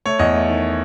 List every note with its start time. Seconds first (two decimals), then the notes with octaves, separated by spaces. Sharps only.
0.06 A3 C#5
0.19 E2 D#5
0.35 A3
0.49 D#3